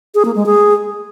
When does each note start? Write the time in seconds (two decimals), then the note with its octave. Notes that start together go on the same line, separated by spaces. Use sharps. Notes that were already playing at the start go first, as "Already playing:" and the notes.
0.15 G#4
0.25 A#3
0.35 G#3
0.46 G#4